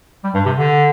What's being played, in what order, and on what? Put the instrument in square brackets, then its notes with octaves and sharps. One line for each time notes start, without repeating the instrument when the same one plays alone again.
[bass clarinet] G3
G2
C3
D3